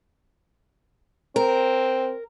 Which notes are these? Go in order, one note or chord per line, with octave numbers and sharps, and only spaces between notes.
C4 A#4